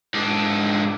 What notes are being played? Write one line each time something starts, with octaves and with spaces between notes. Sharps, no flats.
G#2 D4